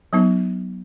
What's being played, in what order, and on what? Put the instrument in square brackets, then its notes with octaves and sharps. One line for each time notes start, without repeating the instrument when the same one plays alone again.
[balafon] F#3 B3 D#4